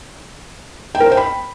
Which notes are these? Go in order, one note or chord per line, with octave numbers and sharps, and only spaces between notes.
G5
A#4
C5
G5
B5